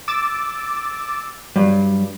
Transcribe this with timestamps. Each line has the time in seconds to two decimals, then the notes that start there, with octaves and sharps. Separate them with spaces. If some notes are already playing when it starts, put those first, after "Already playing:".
0.08 D6 E6 A6
1.56 G2 F#3